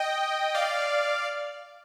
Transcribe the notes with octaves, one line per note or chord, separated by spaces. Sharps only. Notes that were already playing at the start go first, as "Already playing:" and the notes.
Already playing: D#5 G5
D5 F5